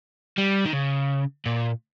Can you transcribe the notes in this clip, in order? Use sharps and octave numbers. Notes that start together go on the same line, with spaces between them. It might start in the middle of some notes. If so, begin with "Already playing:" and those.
G3
D#3
C#3
A#2